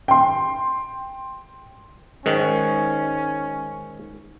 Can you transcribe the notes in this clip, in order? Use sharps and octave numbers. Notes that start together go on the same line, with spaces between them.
G5 C6
G#2 D#3 C#4